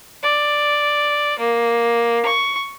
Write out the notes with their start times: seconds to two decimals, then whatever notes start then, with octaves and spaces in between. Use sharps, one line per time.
0.23 D5
1.39 A#3
2.25 C#6